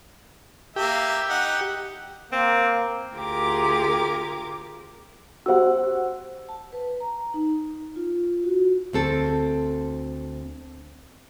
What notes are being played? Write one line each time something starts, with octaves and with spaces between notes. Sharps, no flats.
A#3 G4 E5
D#4 F#5
A#3 C4
D2 F4 G4 G#4 A#4 D6
F#4 G4 C5 F#5 E6
A5
B4
A#5
D#4
F4
F#4
D2 C4 A4